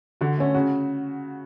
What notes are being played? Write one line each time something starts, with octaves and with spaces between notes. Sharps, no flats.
D3 F#4
A3 C#4
C#3 F#4